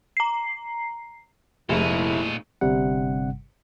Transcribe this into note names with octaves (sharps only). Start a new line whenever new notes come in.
A#5 C7
F1 A#2 G#3 A3 D#4 E4
G1 G2 C3 G3 F#5